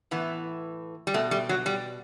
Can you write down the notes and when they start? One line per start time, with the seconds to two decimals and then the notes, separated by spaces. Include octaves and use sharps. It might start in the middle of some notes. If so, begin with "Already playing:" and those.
0.11 A2 E3 B3
1.07 G3
1.14 B2 A3
1.31 G3
1.49 F#3
1.66 G3